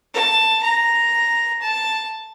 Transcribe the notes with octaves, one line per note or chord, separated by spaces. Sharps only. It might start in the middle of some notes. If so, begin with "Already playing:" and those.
A5
A#5
A5